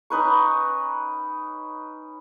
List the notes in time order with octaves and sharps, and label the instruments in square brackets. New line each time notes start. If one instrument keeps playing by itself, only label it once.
[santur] C#4 D#4 B4 C#6